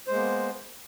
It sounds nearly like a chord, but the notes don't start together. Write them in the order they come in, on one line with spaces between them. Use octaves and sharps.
C5 G#3 A#3 B3